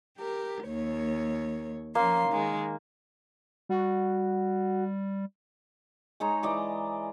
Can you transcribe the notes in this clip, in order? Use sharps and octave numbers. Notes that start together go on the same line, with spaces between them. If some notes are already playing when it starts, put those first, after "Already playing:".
G4 A#4
D#2 C#5
F3 A#3 C#4 C6
D#3 G#3
G3 F#4
G#3 D#4 C#5 A#5
E3 D5 D#5 D6